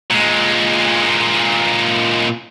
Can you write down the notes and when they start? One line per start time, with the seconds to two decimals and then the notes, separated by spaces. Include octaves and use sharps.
0.11 A#2 G#3